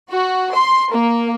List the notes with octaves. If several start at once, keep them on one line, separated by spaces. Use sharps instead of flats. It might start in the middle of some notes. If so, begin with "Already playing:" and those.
F#4
C6
A#3